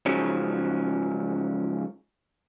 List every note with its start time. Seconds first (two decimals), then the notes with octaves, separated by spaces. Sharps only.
0.06 G#2 C#3 F3 F#3 C#4